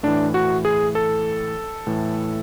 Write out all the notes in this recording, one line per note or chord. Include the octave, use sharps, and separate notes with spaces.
A2 E3 D4
F#4
G#4
A4
A2 E3